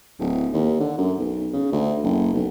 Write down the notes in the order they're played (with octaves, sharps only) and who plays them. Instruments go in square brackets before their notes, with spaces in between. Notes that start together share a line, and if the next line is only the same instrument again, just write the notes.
[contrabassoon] D1
D#2
D3
F#2
B1
C#3
D2
F#1
B1